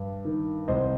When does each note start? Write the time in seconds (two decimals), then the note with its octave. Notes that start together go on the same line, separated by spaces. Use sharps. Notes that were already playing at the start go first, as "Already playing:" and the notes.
Already playing: G2
0.25 D#3
0.68 C2 C5 D#5